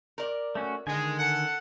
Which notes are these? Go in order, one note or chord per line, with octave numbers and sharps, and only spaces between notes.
A#4 D5
A3 C#4 F#4
D3 D#3 G#3 G#5
A4 F#5